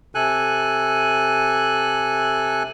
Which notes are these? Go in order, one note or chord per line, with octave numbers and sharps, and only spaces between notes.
C3 A4 G#5 F#6